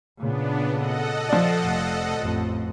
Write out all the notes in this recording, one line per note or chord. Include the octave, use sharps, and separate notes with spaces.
A#2 C#3 B3 D4
A4 D#5 F#5
F3 D5
F1
A1 F2